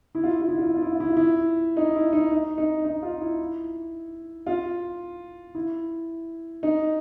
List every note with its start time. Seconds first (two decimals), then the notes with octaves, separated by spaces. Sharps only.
0.15 E4
0.24 F4
0.32 E4
0.41 F4
0.48 E4
0.57 F4
0.66 E4
0.74 F4
0.82 E4
0.92 F4
1.00 E4
1.09 F4
1.17 E4
1.77 D#4
1.95 E4
2.13 D#4
2.31 D#4
2.58 D#4
2.85 D#4
3.03 F4
3.21 E4
4.47 F4
5.55 E4
6.63 D#4